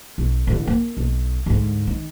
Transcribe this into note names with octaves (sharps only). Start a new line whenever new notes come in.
B1
A1 D3
A#3
B1
D2 G#2
D#3